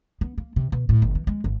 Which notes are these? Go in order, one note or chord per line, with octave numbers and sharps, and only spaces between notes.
B3
A#3
C3
B2
A2
G1
E3
G#3
G#1